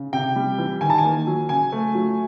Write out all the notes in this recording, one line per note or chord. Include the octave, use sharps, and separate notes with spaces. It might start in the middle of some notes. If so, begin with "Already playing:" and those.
Already playing: C#3
C3 G5
G3
E3
D#3 G#5
A5
G#5
A#3
F#3
C#3 G#5
A3
F#3